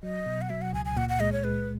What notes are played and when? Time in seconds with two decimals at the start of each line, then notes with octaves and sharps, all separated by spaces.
0.03 F#3 D#5
0.26 B2
0.41 F#5
0.50 F#3 E5
0.62 F#5
0.73 C#2 G#5
0.85 G#5
0.97 A#2 F#5
1.09 F#5
1.20 G#3 D#5
1.32 C#5
1.44 G#3 B4